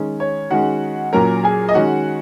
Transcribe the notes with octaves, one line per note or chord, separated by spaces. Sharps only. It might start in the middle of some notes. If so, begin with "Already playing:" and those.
Already playing: D#3 G#3 C#4
C#5
D#3 G#3 C#4 F#4 F#5
A#2 F#3 C#4 A#4 A#5
G#4 G#5
D#5
D#3 G#3 C#4 F#4 F#5